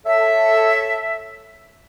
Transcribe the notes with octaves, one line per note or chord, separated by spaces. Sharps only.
A4 C#5 E5